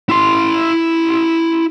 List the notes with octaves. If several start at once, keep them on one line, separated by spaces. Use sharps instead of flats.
E4 C6